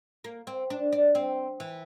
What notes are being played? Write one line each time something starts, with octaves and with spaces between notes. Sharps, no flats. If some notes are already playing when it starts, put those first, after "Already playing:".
A#3
C4
D4
D4
C4
E3